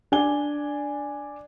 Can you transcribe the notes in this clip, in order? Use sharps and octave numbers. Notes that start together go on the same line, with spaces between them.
D4 D5 G#5 G7